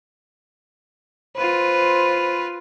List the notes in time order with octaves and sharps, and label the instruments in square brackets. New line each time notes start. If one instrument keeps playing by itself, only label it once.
[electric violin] F4 B4 [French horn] C5